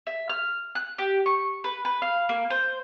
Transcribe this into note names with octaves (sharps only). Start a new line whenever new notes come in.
E5
F6
F#6
G4
C#6
B4
B4
F5
A#3
C5